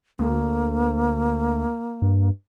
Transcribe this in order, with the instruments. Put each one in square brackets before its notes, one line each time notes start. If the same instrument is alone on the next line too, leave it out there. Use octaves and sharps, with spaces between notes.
[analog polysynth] D2 [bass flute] A#3
[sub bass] G2